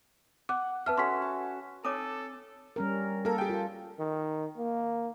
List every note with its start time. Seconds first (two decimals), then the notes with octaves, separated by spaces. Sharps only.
0.49 F#5 D6
0.86 B4 E5 A5 F6
0.97 C#4 F#4 A4 C6 B6
1.22 A5
1.85 C4 A4 C#5 G#5 D6 D#6
2.76 G3 C#4 A#4
3.25 A#3 A4 A#4
3.38 G4 G#4 G5
3.49 F4
3.99 D#3
4.57 A#3